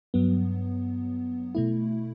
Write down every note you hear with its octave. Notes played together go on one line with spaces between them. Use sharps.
G2 F#3 B3
B2 A3 E4